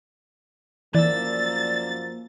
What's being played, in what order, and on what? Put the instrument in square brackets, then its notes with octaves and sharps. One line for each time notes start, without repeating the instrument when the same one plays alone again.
[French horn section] F#2 F3 A#3 [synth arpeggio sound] E3 [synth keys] D5 E6 [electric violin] A6